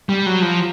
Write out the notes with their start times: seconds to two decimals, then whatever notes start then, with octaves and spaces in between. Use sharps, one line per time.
0.09 G3
0.26 F#3
0.42 F3